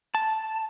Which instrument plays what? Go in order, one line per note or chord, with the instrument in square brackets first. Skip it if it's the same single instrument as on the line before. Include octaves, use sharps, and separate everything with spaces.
[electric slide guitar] A5